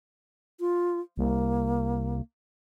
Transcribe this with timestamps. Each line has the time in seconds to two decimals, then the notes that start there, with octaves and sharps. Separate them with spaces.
0.60 F4
1.18 C2 A#3